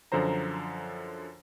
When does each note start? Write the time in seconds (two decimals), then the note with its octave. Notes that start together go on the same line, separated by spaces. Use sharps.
0.12 F#2 D3 F3 C5 A#5